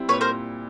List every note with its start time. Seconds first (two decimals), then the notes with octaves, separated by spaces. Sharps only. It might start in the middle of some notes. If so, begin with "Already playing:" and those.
Already playing: G3 C4 E4
0.09 A#2 B4 C#5
0.21 A#4 C5